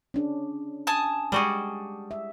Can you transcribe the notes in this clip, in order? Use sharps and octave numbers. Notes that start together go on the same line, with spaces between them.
C#4 D4 G#4
G#5 A5 D#6
G3 G#3 F#4 G#4 D5
E5